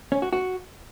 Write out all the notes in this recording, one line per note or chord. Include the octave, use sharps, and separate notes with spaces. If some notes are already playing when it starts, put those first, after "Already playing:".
C#4
F#4
F#4